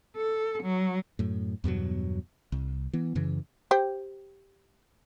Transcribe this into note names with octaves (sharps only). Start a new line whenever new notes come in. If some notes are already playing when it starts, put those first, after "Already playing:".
A4
F#3
F#2 A2
E2 G2 B2 F#3
C2
E3 B3
F#2 C#3 E3
G4 C5 G5